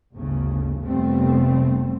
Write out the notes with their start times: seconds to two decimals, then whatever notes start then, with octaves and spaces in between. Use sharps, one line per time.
0.13 G1 D2 C#3
0.81 F1 G3 A3 B3 C4